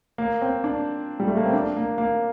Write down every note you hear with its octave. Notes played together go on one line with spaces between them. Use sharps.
A#3
C4
D4
G3
A3
A#3
C4
D4
A#3
A#3